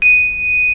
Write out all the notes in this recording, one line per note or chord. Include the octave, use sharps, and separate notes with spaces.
D#7